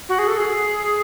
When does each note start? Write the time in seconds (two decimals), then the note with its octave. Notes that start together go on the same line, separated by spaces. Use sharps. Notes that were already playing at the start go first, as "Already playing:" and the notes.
0.09 F#4
0.19 G#4
0.27 A4
0.37 G#4